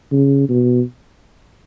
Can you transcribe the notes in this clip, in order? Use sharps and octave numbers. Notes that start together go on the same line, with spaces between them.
C#3
B2